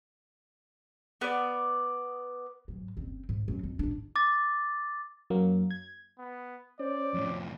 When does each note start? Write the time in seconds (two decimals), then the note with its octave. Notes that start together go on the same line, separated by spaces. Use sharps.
1.21 B3 D5
2.68 G#2 F#3
2.97 F#1 C4
3.29 G#2
3.48 F#2 F#3
3.63 F2
3.79 A1 D4
4.16 D6 A6
5.30 F#2 F#3 A#3
5.71 G#6
6.19 B3
6.79 C#4 C5 D5
7.14 F2 A2 F3